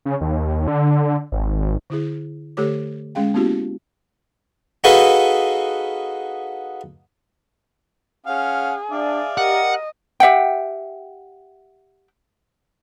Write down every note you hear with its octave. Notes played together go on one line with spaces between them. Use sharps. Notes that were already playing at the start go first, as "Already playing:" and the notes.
C#3
D#2
D3
G#1
D3 E4 G#4
D3 A3 G4 A4 C#5 D6
G#3 C#4 G#4 F5 G5
A#3 B3 C#4 E4 F#4 G4
D#4 F#4 G#4 A4 B4 F5
C#4 G#4 F5 F#5
D4 D5 E5 F5
G4 A#4 D#5 F#5
G4 E5 F#5 G5